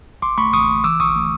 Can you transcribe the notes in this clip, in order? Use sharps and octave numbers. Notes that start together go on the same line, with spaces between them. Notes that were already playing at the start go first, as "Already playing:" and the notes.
A1 C6 D6
A3 B5 C#6
A1 C#6 D#6
A1
E3 D6 E6
A#1 C#6 D#6
A3